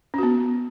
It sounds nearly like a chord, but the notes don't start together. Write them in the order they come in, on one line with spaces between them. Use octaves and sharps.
C#4 F#4 B3